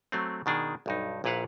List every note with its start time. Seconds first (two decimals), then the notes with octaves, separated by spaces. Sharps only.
0.12 F#3 A3 C4
0.46 B2 D#3 D4 G#4
0.86 B1 G2 D#4
1.24 A#1 A#2 E4 B4 F5 F#5